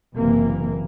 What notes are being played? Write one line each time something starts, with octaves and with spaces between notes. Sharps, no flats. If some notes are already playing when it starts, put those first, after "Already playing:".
F#1 C3 E3 A#3